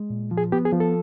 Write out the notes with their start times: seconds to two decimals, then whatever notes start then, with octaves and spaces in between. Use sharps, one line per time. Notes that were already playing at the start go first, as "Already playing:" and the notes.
Already playing: G#3
0.10 A#2
0.31 F3
0.38 G#4
0.52 B3 G4
0.65 G#4
0.73 F3
0.80 A4